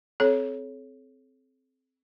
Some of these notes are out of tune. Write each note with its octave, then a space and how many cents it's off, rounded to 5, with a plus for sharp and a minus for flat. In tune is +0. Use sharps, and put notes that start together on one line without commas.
C4 -5 A4 -45 C#5 +0